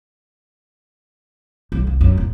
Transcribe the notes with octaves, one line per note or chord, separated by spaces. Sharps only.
B1
C2
F#2
D1